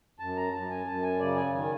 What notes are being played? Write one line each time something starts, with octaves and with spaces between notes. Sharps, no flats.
F#2 A5
A#5
F#2 A5
G#5
F#2 A5
G#5
C#3 D5
G#5
D#3 G#5